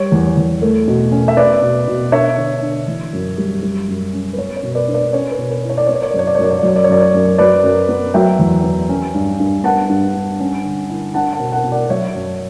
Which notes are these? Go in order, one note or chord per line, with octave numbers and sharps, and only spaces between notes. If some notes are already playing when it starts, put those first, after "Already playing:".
Already playing: G3 C#5
E2
E2
A3
B2
C#4
E5
B3 B4 D5
B2
B2
D4 C#5 E5
D3
D3
E3
F#2
G3
G3
F#2
C#4
B4
B3 C#5
C#5
B2
B4 D5
D4
B4 D5
C#4 C#5
B4
B2
B4
E4
C#5
D5
B3 C#5
D5
C#5
D5
F#2
C#5
D5
C#5
F#2
D5
C#5
D5
F#3 C#5
D5
C#5
F#2 D5
C#5
F#2
F#3 B4 D5
F#2
B3
F#3 E5 G5
E2
B3
C#4
G2
G2
B3 F#5 A5
G2
G2
C#4
D3
E4
D4 F#5 A5
F#5 A5
B2
F#5 A5
B2
D5 F#5
F#3 C#5 E5
F#2